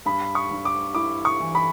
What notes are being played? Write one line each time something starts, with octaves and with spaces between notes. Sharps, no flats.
G2 B5
C#6
G2
D6
E4 D6
C#6
E3
B5